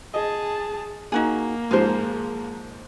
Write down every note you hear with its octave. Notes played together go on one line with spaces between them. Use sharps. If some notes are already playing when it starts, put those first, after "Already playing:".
G#4 D#5 A5
A#3 D#4 F#4 G#4
G#2 F3 G#3 G#4 C5